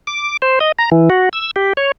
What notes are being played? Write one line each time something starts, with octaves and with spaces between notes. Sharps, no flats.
D6
C5
D#5
A#5
E3
F#4
E6
G4
C#5